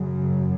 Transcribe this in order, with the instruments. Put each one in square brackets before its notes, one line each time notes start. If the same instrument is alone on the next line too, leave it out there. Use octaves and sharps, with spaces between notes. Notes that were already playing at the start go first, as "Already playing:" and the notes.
Already playing: [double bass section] F#2 C#3